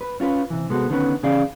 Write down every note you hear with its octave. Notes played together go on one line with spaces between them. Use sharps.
B4
C#4 F4 F#4 B4
C3 E3
C3 G#3 B3 F#4 A4
D3 D#3 B3 C#4 A4 B4
E2 C#3 C#4 G#4 D5 F5